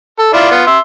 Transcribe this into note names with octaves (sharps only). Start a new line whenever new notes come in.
A4
E4 F4 D5
B3 F4
E5 C6